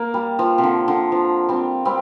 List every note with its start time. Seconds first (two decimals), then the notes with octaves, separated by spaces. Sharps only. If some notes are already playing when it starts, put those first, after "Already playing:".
Already playing: A#3
0.14 G3
0.39 F3
0.58 C3
0.64 D3
0.88 D3
1.12 F3
1.49 G3 C4
1.85 G3 C4